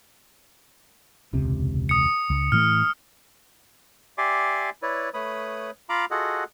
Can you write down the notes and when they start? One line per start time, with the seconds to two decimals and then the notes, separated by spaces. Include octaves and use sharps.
1.33 E1 C#2 C3
1.89 D#6 C#7
2.30 C#2
2.52 A2 E3 A3 F6
4.18 G4 D5 E5 G#5 C6 D6
4.82 E4 B4 C#5 D5
5.14 A3 B4 C#5 B5 D#6
5.89 F4 F5 A#5 B5 D6
6.11 F4 F#4 G#4 A4 D#5 F#5